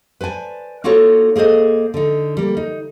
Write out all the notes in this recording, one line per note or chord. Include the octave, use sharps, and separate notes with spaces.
B4 C5 D5 G#5 A5
A#3 D#4 F4 F#4 A4 C#5
A#3 G#4 A4 C5 D#5
D3 D#4
G3 A#3
D#4